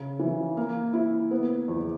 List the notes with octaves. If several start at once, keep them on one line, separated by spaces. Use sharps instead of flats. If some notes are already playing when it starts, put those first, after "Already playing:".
Already playing: C#3
E3
A#3
E4
B3
E2